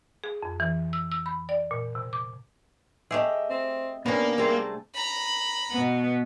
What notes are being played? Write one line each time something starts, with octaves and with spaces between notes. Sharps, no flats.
G#4
F2
E3
E6
E6
B5
D5
A#2
C3
D6
A3 G4 G#4 D#5 E5
C4
C3 A#3 B3 C#4 D4
G3 A3 C4 G#4 A#4 A5
A#5 B5
B2 B3